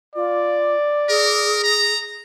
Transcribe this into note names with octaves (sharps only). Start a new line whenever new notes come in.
F4 D5
G#4 A#4
A#5